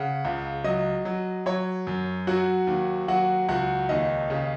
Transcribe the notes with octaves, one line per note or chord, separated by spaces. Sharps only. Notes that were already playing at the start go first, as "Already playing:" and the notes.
Already playing: C#3 F#5
C#2
F#3 D#5 D#6
F#3
F#3 C#5 C#6
F#2
F#3 F#4 F#5
D#2
F#3 F#4 F#5
C#2 F#4 F#5
D#2 D#4 D#5
C#3